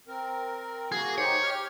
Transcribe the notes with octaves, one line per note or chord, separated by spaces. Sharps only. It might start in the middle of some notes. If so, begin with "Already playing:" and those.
C4 A#4
A#3 F#4 G#4
D#4 G4 C5 C#5
G4 F6